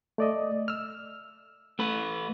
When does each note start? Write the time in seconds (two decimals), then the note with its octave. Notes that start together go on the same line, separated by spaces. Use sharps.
0.18 A3 D5 D#5
0.68 E6 F6
1.79 A3 B4